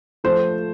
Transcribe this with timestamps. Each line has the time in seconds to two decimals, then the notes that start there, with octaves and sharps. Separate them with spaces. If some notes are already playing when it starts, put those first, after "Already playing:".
0.24 F3 A3 C5